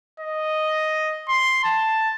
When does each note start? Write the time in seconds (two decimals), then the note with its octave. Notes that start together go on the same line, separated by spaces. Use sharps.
0.20 D#5
1.29 C6
1.64 A5